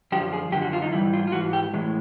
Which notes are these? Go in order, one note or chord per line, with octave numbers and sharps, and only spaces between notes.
F#2 D3 F3 G4
G#4
F#2 D3 F3 G4
F#4
F4
D#4
G#2 E3 G3 E4
F4
F4
G#2 E3 F#4
G4
A2 E3 G#3